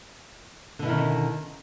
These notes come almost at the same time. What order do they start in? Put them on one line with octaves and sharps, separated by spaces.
D3 B2 E4 D#3 C#4